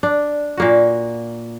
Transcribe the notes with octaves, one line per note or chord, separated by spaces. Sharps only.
D4
A#2 A#3 F#4